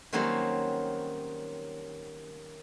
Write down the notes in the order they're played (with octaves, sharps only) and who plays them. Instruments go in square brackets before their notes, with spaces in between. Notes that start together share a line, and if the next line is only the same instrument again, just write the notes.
[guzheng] D#3 F#3 G3 A#3 C4 C#4